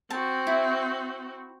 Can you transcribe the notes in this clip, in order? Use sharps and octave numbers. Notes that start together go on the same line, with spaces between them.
C4 F#4 A5
E4